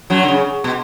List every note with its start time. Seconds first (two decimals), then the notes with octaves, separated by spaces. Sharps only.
0.10 F#2 F#3
0.23 D3
0.28 C#3
0.64 B2